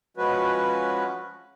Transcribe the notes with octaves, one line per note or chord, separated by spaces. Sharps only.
F3 G#3 C#4 F#4 B4